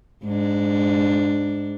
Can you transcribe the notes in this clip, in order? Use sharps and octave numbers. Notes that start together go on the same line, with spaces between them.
G#2 D4